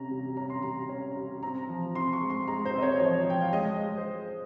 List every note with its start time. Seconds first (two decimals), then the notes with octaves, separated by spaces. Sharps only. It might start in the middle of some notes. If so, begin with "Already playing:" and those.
Already playing: C3 C#4 A#5
0.11 G3
0.37 C#4 A#5
0.50 C6
0.63 G3 A#5
0.89 C#4
1.16 G3
1.43 C4 A#5
1.69 F3
1.95 C4 C6
2.13 C#6
2.21 G#3
2.30 C6
2.47 G#3 A#5
2.65 C5
2.74 C4 D#5
2.82 C#5
2.93 C5
3.00 F3 C#5
3.27 F3 G5
3.41 F5
3.53 G#3 D#5
3.79 G#3
3.97 C5